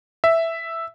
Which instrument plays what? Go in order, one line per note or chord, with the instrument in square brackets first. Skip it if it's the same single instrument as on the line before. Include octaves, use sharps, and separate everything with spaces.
[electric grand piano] E5